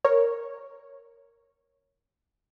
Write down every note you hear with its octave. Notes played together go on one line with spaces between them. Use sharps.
A#4 C#5